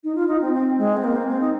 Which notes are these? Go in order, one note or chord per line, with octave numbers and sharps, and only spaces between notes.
D#4
F4
D#4
C4
C4
G#3
C4
A#3
C4
C4
D#4